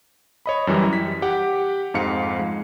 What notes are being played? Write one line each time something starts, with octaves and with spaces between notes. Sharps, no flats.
C#5 D#5 B5
F#2 E3 G3
B6
G4 F#5 G5
F2 G#2 F5 C#7
G#3